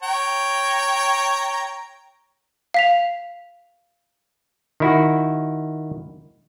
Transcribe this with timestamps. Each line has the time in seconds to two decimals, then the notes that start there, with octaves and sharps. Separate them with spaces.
0.03 C#5 G5 A#5
2.74 F5 B6 F7
4.80 D#3 E4 F#4